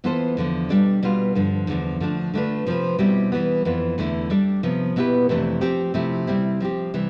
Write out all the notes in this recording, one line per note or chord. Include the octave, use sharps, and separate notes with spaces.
E3 B3 F4 A4 C5
E2 D3 F3
B2 G3 D4 A4 D5
B2 G3 B3 F4
G2 D3 F3
E2 D3 F3
D3 F3 A3 D4
D3 A3 D4 F4 B4
C3 F3 C4 F4 B4
B2 G3 C4 E4 G4
E3 G3 B3
F2 E3 B3 F4
E2 D3 A3 E4
G3 D4 A4 D5
C3 F3 B3
B2 B3 E4 G4 B4
F2 C3 E3 A3 D4
F3 C4 G4
C3 F3 A3 E4
C3 G3 C4 E4
F3 C4 G4
C3 E3 G3